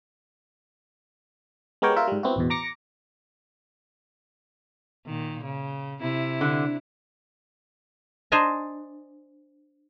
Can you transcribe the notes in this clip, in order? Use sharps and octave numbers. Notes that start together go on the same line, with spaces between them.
G#3 B3 G4 A#4 C#5 G5
F4 A#4 E5
G#2 G3
B3 C4 E4 F#4
A1 E2 B2
A#5 D6 A#6 C#7
A#2 D#3
C#3
C3 E4
D3
D4 C5 D#5 G#5 A#5